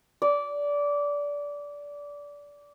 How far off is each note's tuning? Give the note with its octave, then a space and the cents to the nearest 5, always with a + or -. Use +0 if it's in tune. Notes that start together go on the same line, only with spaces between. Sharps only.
D5 -20